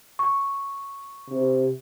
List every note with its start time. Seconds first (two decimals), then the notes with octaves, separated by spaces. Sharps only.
0.19 C#6
1.30 C3